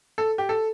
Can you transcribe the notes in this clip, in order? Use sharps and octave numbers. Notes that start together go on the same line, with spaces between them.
A4
G4
A4